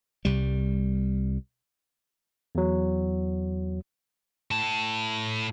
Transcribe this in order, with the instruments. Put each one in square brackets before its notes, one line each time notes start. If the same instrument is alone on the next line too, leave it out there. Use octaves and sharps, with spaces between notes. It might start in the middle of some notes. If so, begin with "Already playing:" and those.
[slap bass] C2 G3
[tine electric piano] E2 F#3
[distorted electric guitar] A2 A5